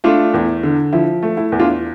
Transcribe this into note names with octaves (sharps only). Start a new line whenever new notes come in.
A3 D4 F4
E2
D3
F3 E4
A3
E4
E2
D4 F4